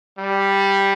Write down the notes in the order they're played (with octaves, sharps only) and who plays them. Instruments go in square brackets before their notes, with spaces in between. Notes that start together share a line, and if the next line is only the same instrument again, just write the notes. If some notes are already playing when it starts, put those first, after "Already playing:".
[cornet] G3